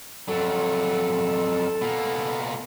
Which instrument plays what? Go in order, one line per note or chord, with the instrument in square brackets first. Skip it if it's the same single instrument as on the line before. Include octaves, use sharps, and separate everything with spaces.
[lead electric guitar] F2 F#3 [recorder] A4
[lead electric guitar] B2 A#3